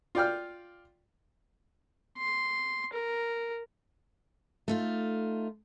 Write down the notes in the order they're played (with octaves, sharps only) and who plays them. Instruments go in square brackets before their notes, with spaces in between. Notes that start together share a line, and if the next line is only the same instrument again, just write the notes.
[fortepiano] F4 D5 G5 F6
[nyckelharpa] C6
A#4
[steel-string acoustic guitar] A3 D#4 F4